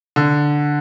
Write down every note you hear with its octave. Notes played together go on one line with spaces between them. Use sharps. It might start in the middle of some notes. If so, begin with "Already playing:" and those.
D3